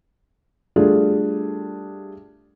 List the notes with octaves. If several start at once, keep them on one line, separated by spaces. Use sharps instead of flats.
G3 A3 D4 F4 G#4